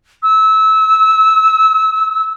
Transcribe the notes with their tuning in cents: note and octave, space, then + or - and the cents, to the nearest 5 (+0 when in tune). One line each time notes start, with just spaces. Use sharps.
E6 -25